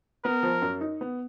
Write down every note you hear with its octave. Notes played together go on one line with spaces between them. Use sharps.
B3 A#4
F3
F#2
D#4
B3